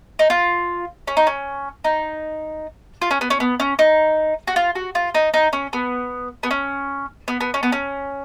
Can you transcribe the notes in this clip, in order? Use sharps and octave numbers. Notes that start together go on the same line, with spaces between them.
D#4
F4
C#4
D#4
C#4
D#4
F4
C#4
B3
C#4
B3
C#4
D#4
F#4
F4
F#4
F4
D#4
D#4
C#4
B3
B3
C#4
B3
B3
C#4
B3
C#4